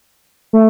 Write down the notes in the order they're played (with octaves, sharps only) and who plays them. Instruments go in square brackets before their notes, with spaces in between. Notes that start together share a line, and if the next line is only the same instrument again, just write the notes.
[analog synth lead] A3